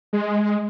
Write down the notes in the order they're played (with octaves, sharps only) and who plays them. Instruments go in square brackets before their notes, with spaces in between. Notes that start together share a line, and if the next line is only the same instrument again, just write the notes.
[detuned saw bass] G#3